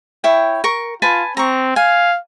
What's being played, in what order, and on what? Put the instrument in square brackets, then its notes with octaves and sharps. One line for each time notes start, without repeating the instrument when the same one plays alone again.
[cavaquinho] E4 C#5 G5
A#4 C#6
[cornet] F4 [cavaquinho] B4 G#5 A5
[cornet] C4 [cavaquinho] A#5 C#6
[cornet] F5 [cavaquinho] G#5